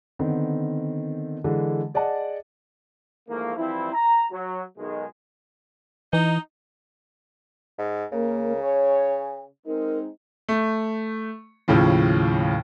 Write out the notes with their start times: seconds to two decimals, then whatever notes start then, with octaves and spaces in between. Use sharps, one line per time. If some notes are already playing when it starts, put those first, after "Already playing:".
0.19 D3 D#3 B3 C4
1.44 D3 E3 G#3
1.94 G#4 D5 D#5 F#5 A5
3.28 G#2 E3 F3 A3 A#3
3.58 E3 F3 G3 C4 E4
3.93 A#5
4.32 F#3
4.78 B1 B2 D#3 G#3
6.13 E3 D#4
7.78 G#2
8.12 C#2 C#3 A#3 A#4
8.62 C#5 G#5
9.66 G#3 C4 D#4 A#4
10.49 A3
11.68 D#2 A2 C#3 F3